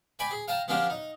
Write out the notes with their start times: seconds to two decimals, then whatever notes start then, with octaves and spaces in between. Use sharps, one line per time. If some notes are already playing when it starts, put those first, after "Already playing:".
0.19 D5 G5 G#5 B5 D6
0.31 G#4
0.48 F5 G5 A5 A#5
0.68 F3 F#3 C#4 D4 G4 A#4
0.90 D#4